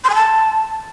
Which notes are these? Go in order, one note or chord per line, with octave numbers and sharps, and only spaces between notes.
C6
G#5
A5